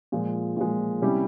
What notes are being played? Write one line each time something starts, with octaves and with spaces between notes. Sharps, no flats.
A#2 F3 G#3
A#2 F3 G#3
C3 G3 C#4 E4 G4